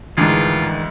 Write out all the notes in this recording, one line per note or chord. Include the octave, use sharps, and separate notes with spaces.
D2 G#2 D#3 E3 G#3 D4 F4 G#4